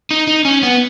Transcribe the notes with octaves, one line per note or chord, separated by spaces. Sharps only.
D#4
D#4
C#4
B3